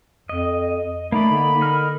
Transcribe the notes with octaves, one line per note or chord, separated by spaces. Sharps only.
F2 D#5
A3 A#3 D#4 D5 B5
D3
D#4 A#4 F6